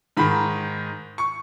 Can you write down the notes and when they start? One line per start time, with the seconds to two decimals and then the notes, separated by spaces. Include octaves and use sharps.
0.17 G#2 D#3 B5
1.18 C#6